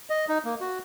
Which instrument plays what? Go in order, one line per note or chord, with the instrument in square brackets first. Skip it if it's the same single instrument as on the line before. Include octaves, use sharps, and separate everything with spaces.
[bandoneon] D#5
D#4
A#3
F#4